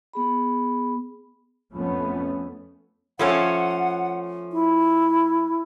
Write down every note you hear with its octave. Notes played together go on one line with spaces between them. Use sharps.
B3 G#4 B5
F2 F3 A3 B3 C#4
F3 A3 C#4 F#5
E4